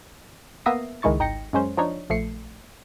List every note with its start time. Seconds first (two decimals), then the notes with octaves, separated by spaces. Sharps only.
0.66 A#3 B3 E5 D#6 A#6 C7
1.02 C#2 D#3 G#3 E4 C#6 A6
1.19 G#1 D#4 G5 A#6 C#7
1.53 F#2 G#3 C#4 C5
1.77 F3 D4 D#4 C#5
2.10 A#1 F3 A3 C7 C#7